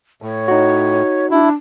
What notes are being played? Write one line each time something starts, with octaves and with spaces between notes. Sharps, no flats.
A2 C#5
D#4 F#4
D4 E4